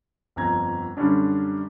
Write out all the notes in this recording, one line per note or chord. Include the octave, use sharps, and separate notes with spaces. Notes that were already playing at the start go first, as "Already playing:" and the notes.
G1 F2 A#5 G#6
F#2 D3 G3 C#4 D4